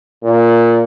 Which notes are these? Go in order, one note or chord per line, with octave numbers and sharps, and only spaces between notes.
A#2